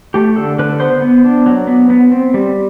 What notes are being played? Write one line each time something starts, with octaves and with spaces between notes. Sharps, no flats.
A3 G4
D3 A4
D3 B4
B3 C5
B3
D4
F#3
B3
B3
C4
G3